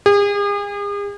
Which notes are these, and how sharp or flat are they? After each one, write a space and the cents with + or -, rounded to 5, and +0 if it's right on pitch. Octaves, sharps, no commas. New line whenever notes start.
G#4 -40